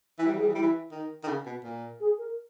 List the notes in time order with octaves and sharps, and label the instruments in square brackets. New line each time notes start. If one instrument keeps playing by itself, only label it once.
[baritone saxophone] E3 [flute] E4
[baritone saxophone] G3
E3
[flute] G#4
[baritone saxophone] G3
E3
[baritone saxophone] G3 [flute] E4
[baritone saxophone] E3
D#3
D#3
C#3
B2
A#2
[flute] G#4
A#4